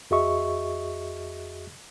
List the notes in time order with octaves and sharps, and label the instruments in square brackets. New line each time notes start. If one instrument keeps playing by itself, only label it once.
[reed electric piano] F2 F#4 G#4 D#5 E5 C#6